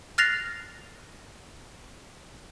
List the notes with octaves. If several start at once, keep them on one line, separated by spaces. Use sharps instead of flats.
F6 F#6 A6 A#6 C7 F7